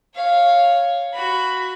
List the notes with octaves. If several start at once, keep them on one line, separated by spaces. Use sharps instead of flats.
C#5 F5
F#4 B5